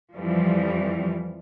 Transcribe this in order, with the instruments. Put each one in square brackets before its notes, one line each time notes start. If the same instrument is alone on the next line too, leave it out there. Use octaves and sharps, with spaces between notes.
[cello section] F2 E3 F3 G3